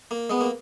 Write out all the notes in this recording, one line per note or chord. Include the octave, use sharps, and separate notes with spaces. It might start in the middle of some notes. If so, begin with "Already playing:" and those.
A#3
G#3 B3
A#3